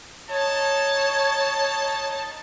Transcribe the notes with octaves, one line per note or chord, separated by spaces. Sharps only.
D#4 C#5 A5